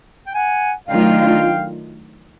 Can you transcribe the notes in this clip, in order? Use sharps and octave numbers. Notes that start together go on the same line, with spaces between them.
G5
F#5 G#5
D#3 F#3 A3 D4 F4 F5 G5